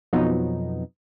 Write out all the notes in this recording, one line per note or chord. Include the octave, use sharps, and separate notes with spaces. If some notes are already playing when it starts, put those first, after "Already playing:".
F2 B2 F3 F#3 B3 D#4